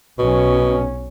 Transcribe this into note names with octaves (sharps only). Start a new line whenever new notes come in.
B1 B2 C#4